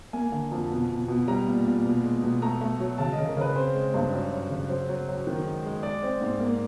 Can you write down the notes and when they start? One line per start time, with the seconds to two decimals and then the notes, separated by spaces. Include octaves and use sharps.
0.13 A#3 G#5
0.32 D3
0.51 F2
0.71 B2
0.89 B2
1.08 B2
1.28 G3 A#5
1.47 A#2
1.65 A#2
1.85 B2
2.03 G#3
2.23 B2
2.42 A3 A#5
2.61 A3
2.80 F#3
2.98 C#3 A5
3.13 C#3 D#5
3.27 A#4
3.36 C#3 B4
3.55 C4 C5
3.74 G#3
3.94 G2
4.13 F#2
4.32 F#2
4.50 C#3
4.69 F#3 C5
4.89 F#3
5.08 F#2
5.27 D#3
5.45 G#3
5.64 G#3
5.83 G#3 D5
6.03 C4
6.21 G#2
6.40 A#3